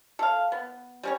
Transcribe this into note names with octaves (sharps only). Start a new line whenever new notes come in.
A4 F5
B3
G3 C#4 C#5